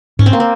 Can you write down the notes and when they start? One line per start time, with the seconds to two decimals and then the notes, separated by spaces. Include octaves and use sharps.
0.19 G#2 C#4
0.26 C4
0.33 A#3
0.40 C4